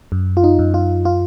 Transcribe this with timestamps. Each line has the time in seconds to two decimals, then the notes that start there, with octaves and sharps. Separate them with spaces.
0.12 F#2
0.37 F4
0.44 D#4
0.59 F#2
0.74 F4
1.05 F4